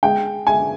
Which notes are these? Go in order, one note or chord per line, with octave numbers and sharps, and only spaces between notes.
G#3 G5
G#3 G#5